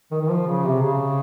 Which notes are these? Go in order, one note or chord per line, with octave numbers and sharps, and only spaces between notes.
D#3
D#3
F3
C#3
C3
C#3